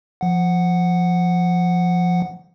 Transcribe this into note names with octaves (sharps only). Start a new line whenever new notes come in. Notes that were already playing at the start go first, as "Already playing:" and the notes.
F3 F#5